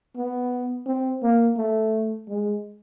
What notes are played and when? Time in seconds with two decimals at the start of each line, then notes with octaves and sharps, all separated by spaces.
0.17 B3
0.87 C4
1.23 A#3
1.57 A3
2.29 G#3